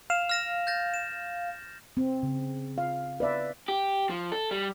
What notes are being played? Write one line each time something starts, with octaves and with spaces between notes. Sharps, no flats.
F5 E7 F7
F6 A#6 E7
G6 A6 A#6
E7
C4
C#3
F5
B4 D5 E5
G4
F3
A4
G3